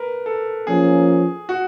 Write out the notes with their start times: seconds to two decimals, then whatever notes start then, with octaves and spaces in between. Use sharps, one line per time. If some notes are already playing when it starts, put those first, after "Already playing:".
Already playing: A#4 B4
0.26 A4
0.67 F3 A#3 C#4 G#4
1.49 F#4